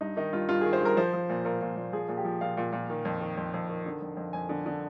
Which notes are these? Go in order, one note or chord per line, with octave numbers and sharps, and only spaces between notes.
G2 D#4
D#3 D#4
G2 F4
G2 F4
D#3 G#4
C5
G2 A#4
F3 C5
F3
A#2
A#2 A#4
A#2
A#2
F3 G#4
A#2
G4
F3
A#2 F5
A#2
A#2
D#3
F2
D#3
F2
F2
D#3
D3
F2
F2
F2 G#5
D3
D3